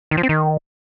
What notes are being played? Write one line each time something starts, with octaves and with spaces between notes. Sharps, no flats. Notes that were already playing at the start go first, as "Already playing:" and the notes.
D#3
F3
C4
D#3